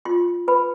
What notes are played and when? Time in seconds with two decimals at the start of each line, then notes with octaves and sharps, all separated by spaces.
0.05 F4 C6
0.48 B4 B5